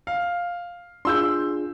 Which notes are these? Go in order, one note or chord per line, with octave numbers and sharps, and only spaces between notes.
F5
D4 F4 G#4 C6 E6 G6